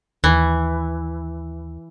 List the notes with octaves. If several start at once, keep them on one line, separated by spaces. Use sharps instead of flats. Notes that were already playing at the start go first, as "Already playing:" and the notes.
D#2 E3